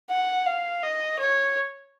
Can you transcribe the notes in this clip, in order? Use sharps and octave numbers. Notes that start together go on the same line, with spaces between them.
F#5
F5
D#5
C#5